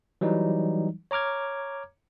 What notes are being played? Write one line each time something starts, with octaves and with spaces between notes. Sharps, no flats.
E3 F#3 G3 D#4
C#5 A#5 D6 F6 G#6